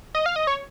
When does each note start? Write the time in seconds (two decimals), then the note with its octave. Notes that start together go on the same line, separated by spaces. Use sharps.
0.15 D#5
0.26 F5
0.36 D#5
0.47 C#5